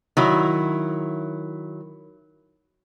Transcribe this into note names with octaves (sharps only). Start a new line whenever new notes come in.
D#3 F#3 E4